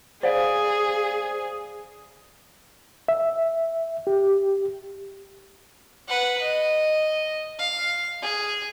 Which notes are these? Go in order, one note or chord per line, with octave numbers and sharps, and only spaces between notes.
G#4 C5 D5 F5
E5
G4
B4 F#5
D#5
F5
G#4